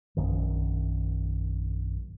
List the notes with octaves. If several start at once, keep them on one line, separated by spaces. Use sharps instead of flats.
A#1 F#2 D#3